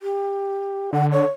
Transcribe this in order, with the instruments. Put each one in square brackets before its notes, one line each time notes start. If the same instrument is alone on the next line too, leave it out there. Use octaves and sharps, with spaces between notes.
[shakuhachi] G4
[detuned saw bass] D3 [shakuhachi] F#5
[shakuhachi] C#5